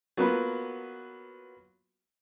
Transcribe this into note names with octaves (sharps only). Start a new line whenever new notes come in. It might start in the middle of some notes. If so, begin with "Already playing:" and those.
F#3 A#3 B3 F4 B4